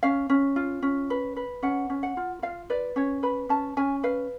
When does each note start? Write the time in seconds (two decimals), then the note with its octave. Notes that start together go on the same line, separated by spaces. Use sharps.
0.03 C#4 F5
0.30 C#4
0.56 F4
0.82 C#4
1.10 B4
1.36 B4
1.63 C#4 F#5
1.90 C#4
2.03 F#5
2.17 F4
2.42 F4 F5
2.70 B4 D5
2.96 C#4 C#5
3.23 B4 B5
3.49 C#4 A5
3.77 C#4 G#5
4.03 B4 F5